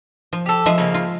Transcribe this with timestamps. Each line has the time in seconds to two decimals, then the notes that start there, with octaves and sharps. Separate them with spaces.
0.33 F3
0.46 G4 A4
0.66 F3 G#3 E5
0.78 C#3 A#3
0.94 F4